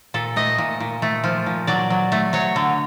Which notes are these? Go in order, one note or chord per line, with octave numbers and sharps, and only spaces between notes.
A#2 A4
A3 D#5
A#2
A#2
A3
F3
A#2
F#3 D5
F#3
A3
F#3 C#5
D3